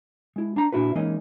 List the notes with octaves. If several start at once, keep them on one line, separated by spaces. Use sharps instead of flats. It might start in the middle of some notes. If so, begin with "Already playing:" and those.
G#3 E4
D4 A#5
A#2 D4 E4 F#4 B4
E3 G#3 A#3 C#4 D#4 D#5